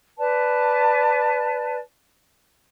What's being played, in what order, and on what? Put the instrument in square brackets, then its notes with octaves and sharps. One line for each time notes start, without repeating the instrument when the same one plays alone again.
[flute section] B4 D5 A5